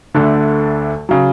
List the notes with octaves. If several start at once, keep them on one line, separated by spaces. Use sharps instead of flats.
D2 D3 A3 D4 A4
C#3 F#3